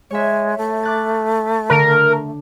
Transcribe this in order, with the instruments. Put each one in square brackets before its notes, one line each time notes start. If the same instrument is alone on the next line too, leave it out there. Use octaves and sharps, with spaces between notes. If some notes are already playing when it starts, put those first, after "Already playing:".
[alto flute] G#3 [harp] C#5 E5
[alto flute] A3
[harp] D6 F#6 A6
[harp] D3 [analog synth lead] A#4